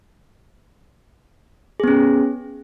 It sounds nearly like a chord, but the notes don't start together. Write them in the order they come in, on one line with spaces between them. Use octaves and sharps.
G#4 B3 C#4